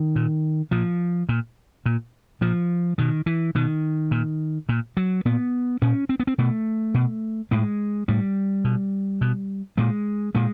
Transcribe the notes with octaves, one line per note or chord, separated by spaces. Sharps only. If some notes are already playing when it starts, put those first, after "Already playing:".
Already playing: D#3
A#2
A#2 F3
A#2
A#2
A#2 F3
B2 D#3
E3
B2 D#3
A#2
A#2
F#3
A#2 B3
A#2 C#4
C4
B3
C4
B2 A3
B2
A2 G#3
A2 G3
B2
B2
A#2 G#3
A#2 G#3